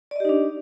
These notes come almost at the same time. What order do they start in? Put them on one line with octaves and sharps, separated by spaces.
D5 D#5 G4 D#4 D4